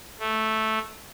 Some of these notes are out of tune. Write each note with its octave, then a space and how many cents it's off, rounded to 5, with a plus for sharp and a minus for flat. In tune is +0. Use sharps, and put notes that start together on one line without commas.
A3 -5